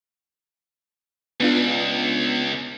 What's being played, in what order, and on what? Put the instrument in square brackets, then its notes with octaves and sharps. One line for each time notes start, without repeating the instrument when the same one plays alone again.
[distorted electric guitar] C#2 [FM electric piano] B3 D4 F4